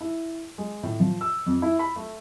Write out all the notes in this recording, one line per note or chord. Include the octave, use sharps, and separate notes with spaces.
E4
G#3
A2
F3
E6
F2
E4
B5
A3